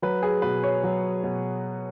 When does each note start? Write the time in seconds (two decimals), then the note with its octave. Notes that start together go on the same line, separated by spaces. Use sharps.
0.02 F#3 B4
0.23 G#4
0.42 B2 B4
0.63 C#5
0.83 F#3
1.24 B2